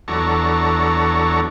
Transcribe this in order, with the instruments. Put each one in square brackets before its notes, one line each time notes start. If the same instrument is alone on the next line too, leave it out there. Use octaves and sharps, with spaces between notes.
[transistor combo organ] E2 F#3 D4 A4 A#5 C#6